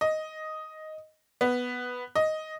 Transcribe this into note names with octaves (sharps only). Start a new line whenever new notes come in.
D#5
B3
D#5